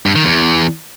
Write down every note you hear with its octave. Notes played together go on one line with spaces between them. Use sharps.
G2
D#3
E2